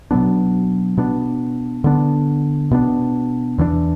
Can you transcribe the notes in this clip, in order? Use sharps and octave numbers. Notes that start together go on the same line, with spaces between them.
B2 F#3 B3 D4
B2 B3 D4
D3 B3 D4
B2 B3 D4
E2 E3 B3 D4